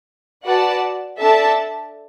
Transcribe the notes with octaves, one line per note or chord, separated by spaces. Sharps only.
F#4 B4 D5 F#5 A5
D4 A4 E5 A5